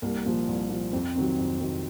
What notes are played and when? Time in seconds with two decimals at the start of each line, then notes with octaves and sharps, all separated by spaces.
0.02 C2 A#3
0.25 A#2 F3
0.48 C2
0.70 A#2 F3
0.93 F2 C4
1.15 C3 D#3 F#3
1.38 F2
1.60 C3 D#3 F#3